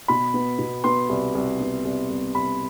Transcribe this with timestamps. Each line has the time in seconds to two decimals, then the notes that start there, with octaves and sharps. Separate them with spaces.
0.08 B2 B5
0.34 B3
0.59 B2
0.84 B3 C6
1.09 C2
1.35 C2
1.60 B3
1.85 C2
2.10 C2
2.35 C2 B5